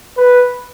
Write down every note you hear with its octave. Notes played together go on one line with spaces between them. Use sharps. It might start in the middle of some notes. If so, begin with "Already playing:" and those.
B4